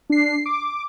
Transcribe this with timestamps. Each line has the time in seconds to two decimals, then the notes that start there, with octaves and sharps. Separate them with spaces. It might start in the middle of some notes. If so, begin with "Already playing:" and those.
0.10 D4 C7
0.46 D6